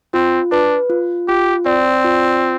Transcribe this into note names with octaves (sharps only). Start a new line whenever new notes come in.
C4 F4
D4 B4
F4
F4 G4
C4 D5
F4